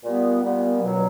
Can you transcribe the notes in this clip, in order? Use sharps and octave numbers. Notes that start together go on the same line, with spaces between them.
A#2 G3 B3
A#2 G3 B3
C#2 B2 F#3